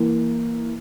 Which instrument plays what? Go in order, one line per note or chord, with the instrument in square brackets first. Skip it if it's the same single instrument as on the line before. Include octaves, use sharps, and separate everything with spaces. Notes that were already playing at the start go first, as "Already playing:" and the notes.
Already playing: [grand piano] E3 A#3